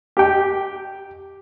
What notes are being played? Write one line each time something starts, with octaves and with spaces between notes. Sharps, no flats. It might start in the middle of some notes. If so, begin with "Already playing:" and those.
G4 G5